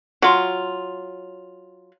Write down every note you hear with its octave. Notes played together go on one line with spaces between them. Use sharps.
F#3 F4